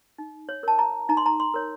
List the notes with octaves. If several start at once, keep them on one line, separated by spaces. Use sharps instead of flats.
D#4
C#5
A#4 C#5 A5
A#5
D#4 A#5
C6
A#5
C6
A#4 C#5